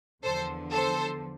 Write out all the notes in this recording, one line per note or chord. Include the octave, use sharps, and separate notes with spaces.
E2 D3 F3 A4 C5
A4 C5